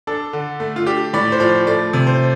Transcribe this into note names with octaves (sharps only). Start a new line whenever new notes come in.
D4 A4
D3
A3
F4
D4 G4
A2 D5
C5
F3 D5
A3 D5
C3
C5